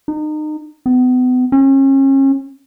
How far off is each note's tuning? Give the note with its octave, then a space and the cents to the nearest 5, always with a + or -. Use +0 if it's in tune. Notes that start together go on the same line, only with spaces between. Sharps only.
D#4 -30
B3 +35
C#4 -35